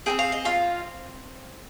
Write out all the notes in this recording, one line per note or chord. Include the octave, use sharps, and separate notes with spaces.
C4 D#4 G#4 G5
F5
D#5
F4 F5